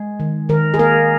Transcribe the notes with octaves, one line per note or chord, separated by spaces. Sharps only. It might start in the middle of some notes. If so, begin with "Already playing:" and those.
Already playing: G#3 G#4
D#3
D#3 A#4
G#4
A#3 A#4